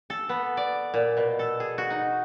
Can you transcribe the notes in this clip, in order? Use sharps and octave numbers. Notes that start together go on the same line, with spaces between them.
A4
B3
D5
A#2
B2
A4
G#4
F#4
D#4